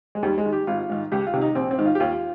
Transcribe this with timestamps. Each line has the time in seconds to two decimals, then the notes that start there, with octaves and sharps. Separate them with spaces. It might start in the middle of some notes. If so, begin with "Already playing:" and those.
0.15 G#3
0.23 D#2 G3
0.38 G#3
0.46 D#3
0.53 G4
0.67 G#1 F4
0.89 G#2 D#3
1.12 C#2 G4
1.27 F4
1.34 C3 D#3
1.41 D#4
1.55 A#1 C4
1.71 C4
1.78 G#2 D#3
1.86 F4
1.95 G4
2.00 D#2 F4